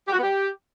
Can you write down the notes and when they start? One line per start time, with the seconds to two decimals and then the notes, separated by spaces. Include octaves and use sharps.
0.07 G4
0.13 F#4
0.18 B3
0.23 G4